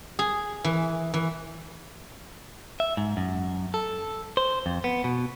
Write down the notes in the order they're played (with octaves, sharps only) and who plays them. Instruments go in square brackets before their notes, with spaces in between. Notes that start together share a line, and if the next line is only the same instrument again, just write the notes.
[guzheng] G#4
E3
E3
[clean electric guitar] E5
G#2
F#2
A4
C5
F2
B3
B2